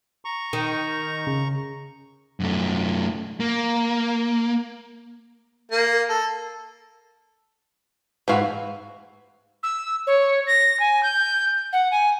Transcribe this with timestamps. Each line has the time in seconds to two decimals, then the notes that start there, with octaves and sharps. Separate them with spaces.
0.25 A#5 C#6
0.53 D#3
1.27 C#3
2.40 F#2 A3
3.40 A#3
5.72 A#3
6.09 A4
8.28 G#2 E3 F#4 B4 F5
9.63 E6
10.07 C#5
10.47 A#6
10.80 G#5
11.03 G6
11.73 F#5
11.91 G#5